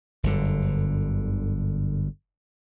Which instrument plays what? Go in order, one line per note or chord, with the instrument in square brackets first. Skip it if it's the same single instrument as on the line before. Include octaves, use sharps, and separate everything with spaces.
[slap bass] G1 F#2 D3